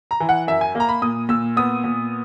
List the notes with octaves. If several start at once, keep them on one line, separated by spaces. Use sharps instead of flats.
A#5
E3
F#5
F#2 E5
G#5
A#3 A#5
B5
A#2 D#6
A#2 E6
B3 D#6
A#2